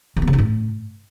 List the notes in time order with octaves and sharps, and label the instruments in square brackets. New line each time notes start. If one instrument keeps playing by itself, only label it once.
[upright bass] D#3
B3
C#3
D#4
A2